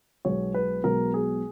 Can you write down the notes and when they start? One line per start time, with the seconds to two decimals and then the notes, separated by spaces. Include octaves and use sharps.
0.25 B1 B2 G#3 B3 C#5
0.54 B4
0.83 B1 B2 G#3 B3 A#4
1.14 G#4